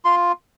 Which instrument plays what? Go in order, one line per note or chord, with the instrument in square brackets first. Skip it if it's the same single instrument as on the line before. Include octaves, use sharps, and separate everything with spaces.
[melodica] F4 C6